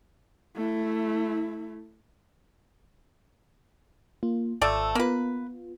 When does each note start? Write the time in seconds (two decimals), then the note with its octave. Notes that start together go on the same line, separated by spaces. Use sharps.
0.56 A3 E4
4.23 A#3 F4
4.61 G#1 F3 A3 A4 D5 E6
4.95 A#3 B3 F4 B4